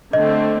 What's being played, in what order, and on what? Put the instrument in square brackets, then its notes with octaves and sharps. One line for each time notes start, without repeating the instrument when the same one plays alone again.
[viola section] D3 A3 C4 [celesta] D#5